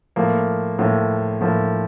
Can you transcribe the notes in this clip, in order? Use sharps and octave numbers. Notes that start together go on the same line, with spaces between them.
A2 F3 A#3
A2 F3 A#3
A2 F3 A#3